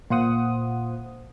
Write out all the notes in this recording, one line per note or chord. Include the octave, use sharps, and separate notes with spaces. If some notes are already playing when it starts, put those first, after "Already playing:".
A#2 F4 C5 F#5 D#6